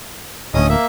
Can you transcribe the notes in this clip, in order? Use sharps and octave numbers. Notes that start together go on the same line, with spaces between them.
D1 D2 C#4 D#5 D#6
A#3 E5